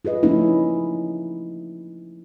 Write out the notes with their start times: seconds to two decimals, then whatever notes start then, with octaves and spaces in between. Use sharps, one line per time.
0.05 F4 G#4 B4 D#5
0.23 F3 A3 A#3 C#4 D#4 E4